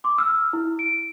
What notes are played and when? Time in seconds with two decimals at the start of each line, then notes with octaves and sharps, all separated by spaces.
0.04 C6 D6
0.18 E6 F6
0.53 E4
0.79 D7